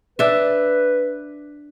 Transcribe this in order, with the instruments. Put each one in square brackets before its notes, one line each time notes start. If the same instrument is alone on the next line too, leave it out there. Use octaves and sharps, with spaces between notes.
[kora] D4 E5 [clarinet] B4